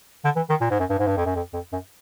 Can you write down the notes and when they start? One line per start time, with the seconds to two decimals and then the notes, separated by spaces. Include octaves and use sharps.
0.24 D3
0.36 E3
0.49 D#3
0.61 A#2
0.70 G#2
0.79 F#2
0.90 G2
0.99 G#2
1.07 G2
1.17 F2
1.26 F#2
1.35 F2
1.53 F2
1.72 F#2